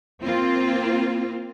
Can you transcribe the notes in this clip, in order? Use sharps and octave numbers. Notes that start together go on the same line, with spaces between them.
A#3 C4 F4